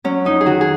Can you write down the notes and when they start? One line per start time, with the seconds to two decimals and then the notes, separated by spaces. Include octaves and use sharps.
0.04 F#3 C#4
0.25 F2 D#4
0.41 G#4
0.46 D#3 F#4
0.61 G#4